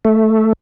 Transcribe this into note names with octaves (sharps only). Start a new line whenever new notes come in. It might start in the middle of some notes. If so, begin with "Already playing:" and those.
A3